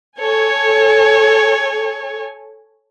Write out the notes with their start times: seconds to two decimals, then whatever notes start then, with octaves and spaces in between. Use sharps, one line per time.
0.19 A4 C#5 G#5